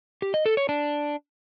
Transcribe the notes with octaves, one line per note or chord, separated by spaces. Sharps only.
G4
D#5
A4
C#5
D4